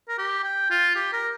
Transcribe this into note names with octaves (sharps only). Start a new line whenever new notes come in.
A#4
G4
G5
F4
G4
A#4